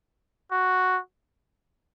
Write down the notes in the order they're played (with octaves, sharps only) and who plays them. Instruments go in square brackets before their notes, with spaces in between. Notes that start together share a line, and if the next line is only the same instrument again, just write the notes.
[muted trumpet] F#4